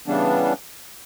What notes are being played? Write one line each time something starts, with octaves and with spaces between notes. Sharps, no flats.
C#3 E3 G3 B3 D4